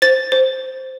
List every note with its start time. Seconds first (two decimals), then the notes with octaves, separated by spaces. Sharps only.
0.02 C5 A6
0.32 C5